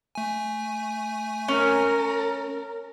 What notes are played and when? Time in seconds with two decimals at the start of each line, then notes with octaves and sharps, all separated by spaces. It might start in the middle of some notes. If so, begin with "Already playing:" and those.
0.15 A3 G#5
1.48 C#4 A#4